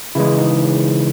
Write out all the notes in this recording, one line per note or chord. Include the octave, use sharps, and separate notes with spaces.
C#3 E3 G#3 E4
D#4